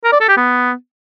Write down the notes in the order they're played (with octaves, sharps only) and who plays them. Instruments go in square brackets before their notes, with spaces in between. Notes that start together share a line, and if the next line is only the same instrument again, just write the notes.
[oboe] A#4
D5
A4
G4
B3